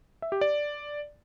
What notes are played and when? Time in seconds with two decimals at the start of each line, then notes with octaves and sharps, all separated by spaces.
0.22 E5
0.32 G4
0.41 D5